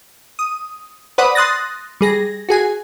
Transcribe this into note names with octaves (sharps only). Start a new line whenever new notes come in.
D#6
B4 C5 D5 F#5 B5 D#6
C6 D#6 F#6 A6 A#6
G3 G#4 A#6
F#4 G#4 G#5